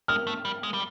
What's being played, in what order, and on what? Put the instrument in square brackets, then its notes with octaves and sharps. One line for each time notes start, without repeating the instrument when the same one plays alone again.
[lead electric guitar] G#3 [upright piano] F6
[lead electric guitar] A3
G3
G#3
G3